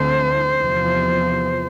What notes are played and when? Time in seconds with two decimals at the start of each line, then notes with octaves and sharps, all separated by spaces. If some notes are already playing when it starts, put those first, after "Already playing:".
Already playing: D2 D3 A3 C4 C5
0.60 E2 C3 F3